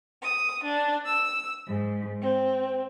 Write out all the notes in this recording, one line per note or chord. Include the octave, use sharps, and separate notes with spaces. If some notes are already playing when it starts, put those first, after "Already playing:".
D#6
D4
E6
G#2
C4